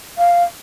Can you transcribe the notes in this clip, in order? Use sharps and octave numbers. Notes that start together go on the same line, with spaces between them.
F5